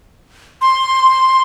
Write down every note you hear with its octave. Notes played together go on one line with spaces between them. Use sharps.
C6